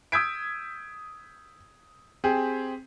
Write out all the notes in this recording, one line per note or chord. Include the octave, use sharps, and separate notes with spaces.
D#6 E6 G6 G#6 B6 D7
C4 G4 G#4